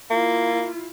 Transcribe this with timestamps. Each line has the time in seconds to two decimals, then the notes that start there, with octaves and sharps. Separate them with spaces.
0.10 A#3 E4 F4